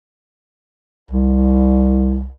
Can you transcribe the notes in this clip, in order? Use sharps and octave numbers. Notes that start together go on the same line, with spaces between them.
C2